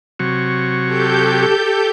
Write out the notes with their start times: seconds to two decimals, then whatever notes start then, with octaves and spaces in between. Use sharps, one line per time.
0.19 C3 F#3 C#6
0.86 G4 A4 G6